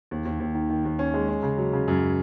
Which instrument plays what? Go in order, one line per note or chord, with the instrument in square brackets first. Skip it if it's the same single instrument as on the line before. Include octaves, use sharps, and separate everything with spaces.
[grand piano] D#2
D#2
D#2
D#3
D#3
D#2
C#4
G#3
C#4
C#3
F#3
C#3
F#2